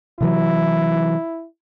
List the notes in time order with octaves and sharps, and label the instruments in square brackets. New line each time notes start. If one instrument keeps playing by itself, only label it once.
[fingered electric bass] C3 E3 F#3 [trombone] E4